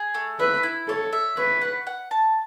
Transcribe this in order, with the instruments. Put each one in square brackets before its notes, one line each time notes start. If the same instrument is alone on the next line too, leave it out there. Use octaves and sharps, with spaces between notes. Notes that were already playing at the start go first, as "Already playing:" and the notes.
Already playing: [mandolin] G#4
A3
[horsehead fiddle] B4 [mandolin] E5
[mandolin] E4
[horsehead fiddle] A4 [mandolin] C#5
[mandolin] E5
[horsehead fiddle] B4 [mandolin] C#5
[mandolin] F#5
F#5
A5